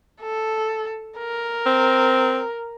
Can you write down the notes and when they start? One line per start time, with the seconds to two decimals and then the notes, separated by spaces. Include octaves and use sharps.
0.22 A4
1.18 A#4
1.66 C4